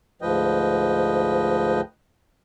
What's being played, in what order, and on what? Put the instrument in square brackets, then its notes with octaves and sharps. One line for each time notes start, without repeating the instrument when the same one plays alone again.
[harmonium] D2 G#2 F3 B4 D#5 G5